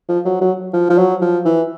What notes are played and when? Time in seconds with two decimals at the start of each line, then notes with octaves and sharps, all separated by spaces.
0.09 F3
0.25 F#3
0.41 F#3
0.73 F3
0.90 F3
0.98 F#3
1.22 F3
1.45 E3